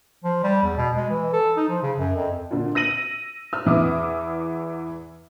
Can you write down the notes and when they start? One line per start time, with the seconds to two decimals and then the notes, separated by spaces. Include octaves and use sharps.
0.24 F3
0.43 G3
0.63 E2
0.77 B2
0.97 G#3
1.10 E3
1.33 A4
1.57 D#4
1.69 F3
1.82 C#3
1.97 F#2
2.16 F2
2.51 A#2 D3
2.75 E6 A#6 D#7 F#7
3.53 E6 F6
3.66 E2 E3 E5 D6 D#6